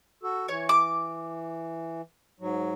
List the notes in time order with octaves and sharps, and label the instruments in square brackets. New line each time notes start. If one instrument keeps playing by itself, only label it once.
[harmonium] F#4 A4
[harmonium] E3 [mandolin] C#5
[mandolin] D6
[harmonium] G#2 F#3